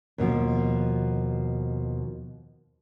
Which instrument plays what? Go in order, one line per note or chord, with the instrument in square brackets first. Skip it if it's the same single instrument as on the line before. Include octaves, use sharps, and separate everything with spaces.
[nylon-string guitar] D#2 B2 F3